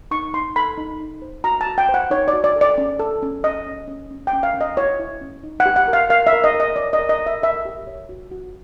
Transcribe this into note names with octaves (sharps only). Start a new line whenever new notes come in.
D#4 C#6
D#4 C6
A4 B5
D#4
D#4
C5
F#4 A#5
A5
F#4
G5
C5
F#5
D#4 C#5
D5
F#4
D5
A4
D5
C#4
A4
C#4
C#4 D#5
C#4
C#4
C#4
G5
C#4
F5
C#4
D#5
E4 C#5
E4
C#4
D#4
F#5
G4
F#5
A#4
F5
A#4 F5
E5
A#4
D#5
A#4
D#5
C#5 D5
D#5
A#4
D#5
A#4
E5
A#4 E5
G4
C#5
F#4
F#4